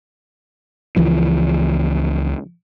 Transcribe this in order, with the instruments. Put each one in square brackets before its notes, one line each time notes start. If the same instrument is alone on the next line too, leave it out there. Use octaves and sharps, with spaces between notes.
[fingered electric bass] C#2 E3 F3